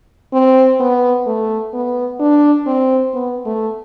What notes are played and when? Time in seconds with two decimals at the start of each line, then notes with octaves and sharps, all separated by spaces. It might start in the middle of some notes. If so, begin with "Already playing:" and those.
0.33 C4
0.80 B3
1.26 A3
1.74 B3
2.20 D4
2.67 C4
3.14 B3
3.45 A3